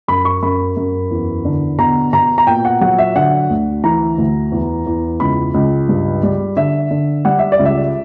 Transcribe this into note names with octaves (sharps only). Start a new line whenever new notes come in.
F#2 B5
C#6
F#2 B5
F#2
E2
D3
B2 A#5
B2 A#5
A#5
A#2 G5
F#5
F#3 F#5
E5
D3 F#5
D2
E3 A#5
D2
E2
E2
C#2 B5
C#2
G2
G3
D3 E5
D3
G3 F#5
E5
D5
C#2
E5